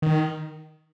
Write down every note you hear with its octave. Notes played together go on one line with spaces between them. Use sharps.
D#3